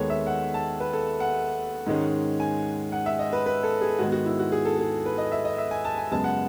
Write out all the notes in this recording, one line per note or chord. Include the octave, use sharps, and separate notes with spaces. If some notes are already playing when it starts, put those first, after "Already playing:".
Already playing: D#2 D#3 G#3 B3 A4 C#5
E5
F#5
A5
B4
A4
F#5
G#2 D#3 G#3 C#4
G#5
F#5
E5
D#5
B4
B4
A4
G#4
G#2 D#3 G#3 B3 F#4
F#4
E4
F#4
G#4
A4
G#4
B4
D#5
E5
D#5
E5
G#5
A5
G#5
F#2 C#3 G#3 B3 A5
F#5